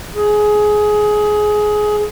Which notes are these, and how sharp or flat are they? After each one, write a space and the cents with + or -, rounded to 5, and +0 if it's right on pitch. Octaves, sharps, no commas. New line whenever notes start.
G#4 +15